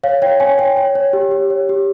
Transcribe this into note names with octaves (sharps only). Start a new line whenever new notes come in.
C#5 F5
C#5 G5
C#5 G#5
C#5 G5
C#5
C#5
G4
G4
C#5
G4